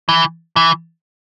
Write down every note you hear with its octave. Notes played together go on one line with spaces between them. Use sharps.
E3
E3